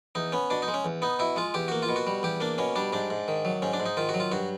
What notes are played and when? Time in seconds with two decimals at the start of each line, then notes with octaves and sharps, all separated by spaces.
0.15 E2 D#4
0.32 B3 C#4
0.50 B2 D4
0.62 D#4
0.68 G#3
0.74 C#4
0.85 E2
1.02 B3 D#4
1.19 B2 E4
1.36 G#3 F4
1.54 E2 G4
1.68 A#3 F#4
1.83 F4
1.89 B2
1.96 F#4
2.07 G3
2.23 E2 G4
2.40 A#3 D4
2.58 B2 C#4
2.76 G3 D4
2.93 G#2 D4
3.10 G#2
3.28 D#3
3.45 F#3
3.62 G#2 C#4
3.73 D4
3.80 G#2
3.86 D#4
3.97 D#3 F4
4.09 F#4
4.14 F#3
4.20 F4
4.32 G2 F#4